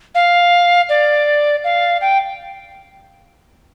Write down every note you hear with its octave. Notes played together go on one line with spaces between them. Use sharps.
F5
D5
F5
G5